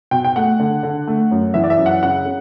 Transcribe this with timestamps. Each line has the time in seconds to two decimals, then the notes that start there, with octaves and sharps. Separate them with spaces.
0.11 B2 G5
0.24 G5
0.36 A3 F#5
0.60 D3
0.83 D3
1.07 A3
1.31 F#2
1.54 E3 E5
1.64 D5
1.70 E5
1.78 F#2
1.86 F#5
2.03 C#3 F#5
2.25 C#3